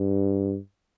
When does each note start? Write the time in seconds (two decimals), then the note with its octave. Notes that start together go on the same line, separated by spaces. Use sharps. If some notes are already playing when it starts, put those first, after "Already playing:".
Already playing: G2